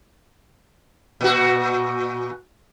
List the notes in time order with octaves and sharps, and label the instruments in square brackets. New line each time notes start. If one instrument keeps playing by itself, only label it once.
[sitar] A#2 F#4